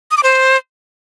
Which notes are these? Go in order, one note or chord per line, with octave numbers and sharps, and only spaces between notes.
D#6
D6
C5